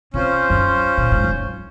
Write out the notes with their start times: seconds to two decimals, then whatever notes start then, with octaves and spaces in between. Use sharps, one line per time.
0.14 C3 C#4 F4 C5
0.50 F#2
0.98 A#2
1.11 G#2
1.24 F#2